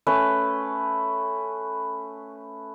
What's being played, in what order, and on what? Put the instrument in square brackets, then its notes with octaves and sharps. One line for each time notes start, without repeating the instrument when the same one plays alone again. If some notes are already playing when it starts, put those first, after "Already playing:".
[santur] A3 C#4 B4